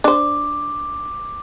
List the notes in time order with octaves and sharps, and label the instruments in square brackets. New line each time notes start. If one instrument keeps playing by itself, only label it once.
[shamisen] D4 C5 [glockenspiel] D6